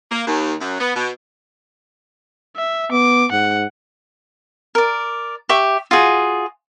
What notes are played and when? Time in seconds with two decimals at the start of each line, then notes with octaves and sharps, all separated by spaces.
0.11 A#3
0.27 D#2
0.60 F#2
0.80 B3
0.95 B2
2.56 E5
2.92 B3 D6
3.32 G#2 F#5
4.75 A#4 D5
5.49 G4 E5 C#6
5.91 F4 F#4 G#4